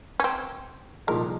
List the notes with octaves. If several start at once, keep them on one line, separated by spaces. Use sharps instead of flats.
C#4
C4
C2 A#2 F3 G#3 D#4 A#4